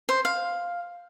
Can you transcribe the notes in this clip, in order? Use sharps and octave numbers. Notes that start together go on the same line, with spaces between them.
C5
F5